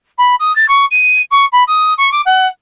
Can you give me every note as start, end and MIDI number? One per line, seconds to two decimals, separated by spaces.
0.18 0.35 83
0.39 0.54 87
0.55 0.68 93
0.68 0.85 85
0.91 1.21 99
1.31 1.45 85
1.52 1.63 83
1.67 1.93 87
1.98 2.09 85
2.12 2.21 86
2.25 2.46 78